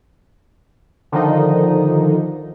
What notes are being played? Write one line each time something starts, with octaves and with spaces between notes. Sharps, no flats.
D3 D#3 F3 D#4